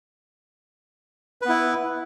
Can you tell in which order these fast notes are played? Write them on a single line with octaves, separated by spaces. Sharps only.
B4 B3 E4